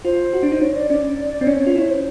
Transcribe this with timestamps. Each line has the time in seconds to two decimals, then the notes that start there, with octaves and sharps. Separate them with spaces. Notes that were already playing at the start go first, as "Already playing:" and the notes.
0.05 F4 C5
0.33 F#4
0.43 D4
0.52 D#4
0.62 D4 C#5
0.76 D5
0.90 C#4 D5
1.41 C4
1.47 C#4 C#5
1.67 F4
1.76 E4 C#5
1.90 C5